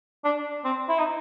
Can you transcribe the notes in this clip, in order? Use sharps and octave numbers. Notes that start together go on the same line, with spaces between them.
D4
C4
E4
D#4